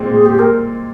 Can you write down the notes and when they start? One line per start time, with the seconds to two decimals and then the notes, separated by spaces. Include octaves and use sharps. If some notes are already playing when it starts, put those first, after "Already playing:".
Already playing: A#2 G#3 C4
0.11 A#2 G#4
0.26 A#2 G4
0.39 A#4